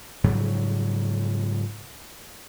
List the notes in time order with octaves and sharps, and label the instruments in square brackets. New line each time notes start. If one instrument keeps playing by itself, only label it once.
[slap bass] G#2 C#3 F#3 G3